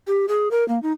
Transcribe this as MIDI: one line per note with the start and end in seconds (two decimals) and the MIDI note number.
0.07 0.26 67
0.28 0.48 68
0.51 0.66 70
0.68 0.81 58
0.82 0.92 63